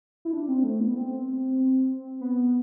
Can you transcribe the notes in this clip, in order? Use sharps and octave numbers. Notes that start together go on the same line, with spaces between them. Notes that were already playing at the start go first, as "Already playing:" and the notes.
E4
D4
C4
A3
B3
C4
B3